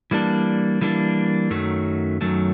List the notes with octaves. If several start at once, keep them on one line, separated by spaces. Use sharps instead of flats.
E3 G3 A#3 D4
E3 G3 A#3 D4
F#2 D#3 F#3 A3
F#2 D#3 F#3 A3